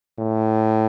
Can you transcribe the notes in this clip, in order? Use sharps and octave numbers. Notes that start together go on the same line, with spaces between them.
A2